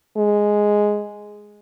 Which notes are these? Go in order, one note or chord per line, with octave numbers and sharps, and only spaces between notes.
G#3